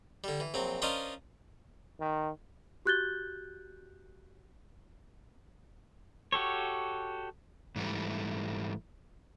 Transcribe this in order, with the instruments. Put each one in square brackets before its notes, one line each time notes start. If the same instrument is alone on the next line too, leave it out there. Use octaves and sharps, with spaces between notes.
[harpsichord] D3 G3
E3
A#1 F#3 C4
C#4 D4 F4 A#4 C5 D#5
[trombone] D#3
[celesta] F#4 G4 F#6 G6 A6 G7
[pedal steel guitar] F#4 G4 A4 C#5
[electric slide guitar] G#2 E3 G3 A3